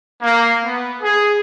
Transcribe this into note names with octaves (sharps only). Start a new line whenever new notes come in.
A#3
B3
G#4